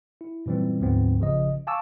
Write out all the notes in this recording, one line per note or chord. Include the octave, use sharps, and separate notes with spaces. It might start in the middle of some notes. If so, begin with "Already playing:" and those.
E4
F#2 A#2 E3 G3 C4
D2 G#2 F3 B3 C4
A1 C#3 F3 D#5
F5 G#5 A5 C#6 D6 E6